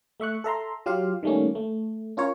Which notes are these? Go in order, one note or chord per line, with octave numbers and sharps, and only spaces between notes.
A3 E5 C#6 F#6
A4 E5 A#5 C6
F#3 F4 G4 F5
D#3 G3 A3 A#3 C#4
A3
C#4 F4 A#4 C#5